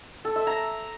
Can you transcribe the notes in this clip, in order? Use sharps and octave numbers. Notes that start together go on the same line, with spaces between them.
A4
E5
A#5